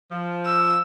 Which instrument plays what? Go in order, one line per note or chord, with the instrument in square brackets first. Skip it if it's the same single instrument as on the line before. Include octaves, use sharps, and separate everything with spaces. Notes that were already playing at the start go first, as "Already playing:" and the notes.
[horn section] F3
[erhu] E6